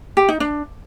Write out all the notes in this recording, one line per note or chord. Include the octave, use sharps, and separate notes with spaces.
G4
D#4
D4